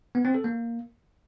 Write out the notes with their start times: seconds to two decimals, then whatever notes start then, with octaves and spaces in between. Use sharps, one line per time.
0.15 B3
0.25 C4
0.35 A4
0.44 A#3